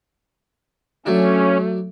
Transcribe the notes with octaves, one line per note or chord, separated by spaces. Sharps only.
F#3 A3 C#4 D4